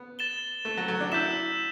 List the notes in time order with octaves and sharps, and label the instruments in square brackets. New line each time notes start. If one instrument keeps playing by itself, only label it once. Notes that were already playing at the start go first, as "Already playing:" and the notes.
Already playing: [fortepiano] B3
[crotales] A6 E7 G7
[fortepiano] A3
F#3
F#3
D4
[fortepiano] E4 [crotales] E6 G6 B6 E7